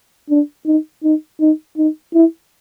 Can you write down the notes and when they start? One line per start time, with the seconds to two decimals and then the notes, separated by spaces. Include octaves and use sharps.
0.30 D4
0.66 D#4
1.03 D#4
1.40 D#4
1.77 D#4
2.14 E4